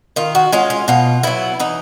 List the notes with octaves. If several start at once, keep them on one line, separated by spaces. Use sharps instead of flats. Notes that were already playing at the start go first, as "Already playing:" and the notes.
D#3 F4
F#4
G#3 C#4 F4
F4
B2 F4
F#3 B3 E4
E3 D#4